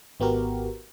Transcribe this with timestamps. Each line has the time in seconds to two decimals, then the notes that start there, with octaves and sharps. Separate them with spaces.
0.20 G#1 B3 F#4 G4 A#4